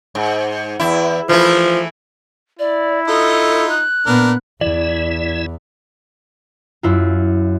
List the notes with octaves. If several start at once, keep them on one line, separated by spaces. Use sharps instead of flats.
G#2
E2 E4
E3 F3 A3 E4
E4 D5
D#4 F4 A4 D#5
F#6
A#2 B3 D4 A#4
E2 E3 E4 D5
F#2 E4 F4